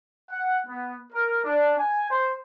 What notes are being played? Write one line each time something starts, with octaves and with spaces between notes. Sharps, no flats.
F#5
B3
A#4
D4
G#5
C5